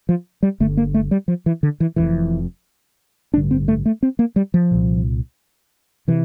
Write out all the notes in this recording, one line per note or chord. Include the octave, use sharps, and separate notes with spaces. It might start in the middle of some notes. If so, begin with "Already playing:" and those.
F3
G3
G1 G2 D3 A3
A#3
A3
G3
F3
E3
D3
E3
F1 F2 D3 E3
A1 G2 D3 D4
C4
A3
A3
C4
A#3
G3
F3
C2 A#2
C3 E3